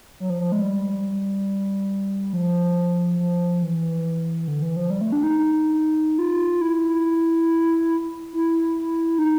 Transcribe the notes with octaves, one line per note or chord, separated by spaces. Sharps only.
F#3
F3
F3
G#3
G3
F3
F3
E3
D3
E3
F3
G3
A3
D4
D#4
F4
E4
E4
D#4